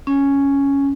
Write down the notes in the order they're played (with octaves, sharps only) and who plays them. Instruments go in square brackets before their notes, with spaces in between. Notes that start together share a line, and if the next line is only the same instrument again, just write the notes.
[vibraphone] C#4